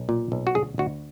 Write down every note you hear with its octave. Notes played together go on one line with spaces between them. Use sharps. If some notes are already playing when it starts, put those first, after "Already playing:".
Already playing: B1
A#2
B1
F#4
D2 G#4
D2 F#4